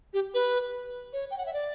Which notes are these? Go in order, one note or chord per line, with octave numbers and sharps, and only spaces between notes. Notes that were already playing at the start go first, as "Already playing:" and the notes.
G4
B4
C#5
G5
F#5
E5
D5